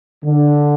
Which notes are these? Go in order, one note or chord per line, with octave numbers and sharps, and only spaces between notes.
D3